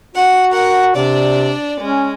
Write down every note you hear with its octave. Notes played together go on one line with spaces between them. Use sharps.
F#4 F#5
A#4 F#5
C3 D4 D5
G#3 C#4